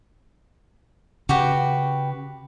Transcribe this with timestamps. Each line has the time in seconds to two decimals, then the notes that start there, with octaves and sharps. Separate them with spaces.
1.29 C#3 F#4 G4 B4